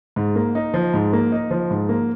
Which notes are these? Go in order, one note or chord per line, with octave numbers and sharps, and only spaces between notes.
G#2
A#3
D#4
F3
G#2
A#3
D#4
F3
G#2
A#3